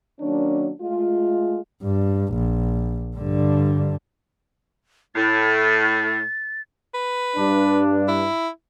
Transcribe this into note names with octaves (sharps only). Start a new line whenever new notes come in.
D#3 F#3 A#3 C#4 D4
G#3 A3 F4
G2
A#1
G2 D3
A2 A6
B4
G2 D4
E4